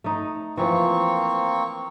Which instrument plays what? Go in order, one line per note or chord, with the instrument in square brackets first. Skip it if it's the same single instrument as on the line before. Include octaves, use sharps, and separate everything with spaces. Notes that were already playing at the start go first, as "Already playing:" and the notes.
[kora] A3 D#4
[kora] E3 F3 [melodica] A#3 C4 C#6